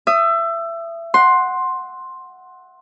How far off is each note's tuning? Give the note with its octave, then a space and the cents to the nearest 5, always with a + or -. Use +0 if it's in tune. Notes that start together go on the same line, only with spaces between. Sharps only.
E5 +25 D#6 +0
F#5 +0 C6 +10